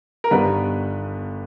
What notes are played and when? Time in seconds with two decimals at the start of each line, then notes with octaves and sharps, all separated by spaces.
0.24 A#4
0.31 G1 G2 D#3 G3 B3 B4